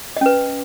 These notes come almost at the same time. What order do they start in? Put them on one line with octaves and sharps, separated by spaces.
D#5 C#4 B4